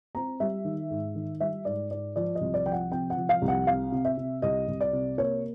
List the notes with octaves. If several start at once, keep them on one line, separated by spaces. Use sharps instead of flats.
C4 A#5
G3 E5
D#3
G#2
D#3
G3 E5
G#2 D5
G#2 D5
F3 D5
D#5
C2
D5
F3 G5
F#5
C3 G5
F#5
F3
F5
C2
F#5
C3 F5
C3
E5
C3
C2 D#5
C2
D5
C3
A#3 C#5